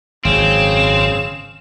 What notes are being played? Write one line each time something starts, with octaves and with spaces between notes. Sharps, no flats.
G#1 F#2 C#3 C4 E7